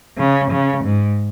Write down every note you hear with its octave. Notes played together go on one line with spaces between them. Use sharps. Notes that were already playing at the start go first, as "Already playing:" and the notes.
C#3
C#3
G#2